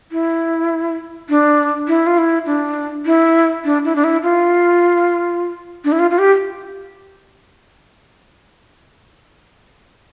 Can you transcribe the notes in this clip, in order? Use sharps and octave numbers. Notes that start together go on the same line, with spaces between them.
E4
D4
E4
F4
E4
D4
E4
D4
E4
D4
E4
F4
D4
E4
F4
F4
G4